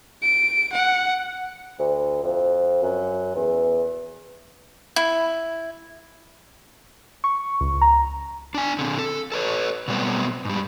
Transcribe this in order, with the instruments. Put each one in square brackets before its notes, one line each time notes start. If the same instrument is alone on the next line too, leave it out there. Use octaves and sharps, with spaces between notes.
[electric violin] D7
F#5
[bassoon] D2
F2
F#2
E2
[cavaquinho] E4
[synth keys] C#6
C#2
A#5
[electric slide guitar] D4 G#5
D3 C4
A4
A4 B4 C#5
B2 F#3 G3 A3 B3 C4
G#2 G3